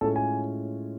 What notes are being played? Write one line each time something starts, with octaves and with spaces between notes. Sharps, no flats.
A2 G#3 C#4 F4 A4
G#5